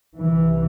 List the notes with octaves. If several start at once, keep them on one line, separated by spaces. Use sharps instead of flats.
C2 C3 E3